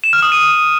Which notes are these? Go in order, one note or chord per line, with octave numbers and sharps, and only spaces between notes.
E7
F6
D#6
D#7